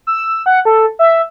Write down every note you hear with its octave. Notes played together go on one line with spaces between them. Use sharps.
E6
F#5
A4
E5